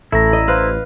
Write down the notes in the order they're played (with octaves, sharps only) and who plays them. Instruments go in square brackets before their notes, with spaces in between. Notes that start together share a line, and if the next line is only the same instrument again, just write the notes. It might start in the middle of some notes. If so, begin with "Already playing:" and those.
[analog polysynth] A1 [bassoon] A3 [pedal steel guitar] E4 A#5
[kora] D#5
[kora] B4 F5 [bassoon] C5